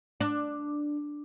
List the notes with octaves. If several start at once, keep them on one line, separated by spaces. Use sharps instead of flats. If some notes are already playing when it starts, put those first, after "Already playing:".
D4